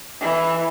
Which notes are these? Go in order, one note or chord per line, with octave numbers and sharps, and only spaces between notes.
E3